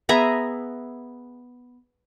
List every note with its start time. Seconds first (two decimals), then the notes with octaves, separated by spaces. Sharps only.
0.09 B3 G#4 E5 A#5